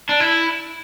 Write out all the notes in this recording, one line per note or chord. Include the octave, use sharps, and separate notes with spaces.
D4
E4